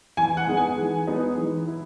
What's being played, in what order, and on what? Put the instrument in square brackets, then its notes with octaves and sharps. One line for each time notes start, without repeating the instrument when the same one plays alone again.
[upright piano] E3 [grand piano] G#5
[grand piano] F#5
[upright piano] G#3 B3 D#4 G#4
[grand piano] G#5
[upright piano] E3
G#3 B3 D#4 G#4
E3
E4